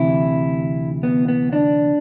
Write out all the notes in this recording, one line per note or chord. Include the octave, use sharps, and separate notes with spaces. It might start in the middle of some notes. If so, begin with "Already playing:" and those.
Already playing: D2 C3 E3 E4
B3
B3
D4